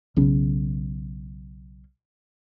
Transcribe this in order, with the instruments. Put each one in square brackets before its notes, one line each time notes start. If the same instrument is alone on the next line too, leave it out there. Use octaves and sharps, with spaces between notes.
[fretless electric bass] B1 C#3 C#4